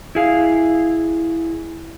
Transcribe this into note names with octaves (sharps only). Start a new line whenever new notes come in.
E4 G#4 F5